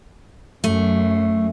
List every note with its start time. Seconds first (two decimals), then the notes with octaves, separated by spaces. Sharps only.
0.64 F#2 A3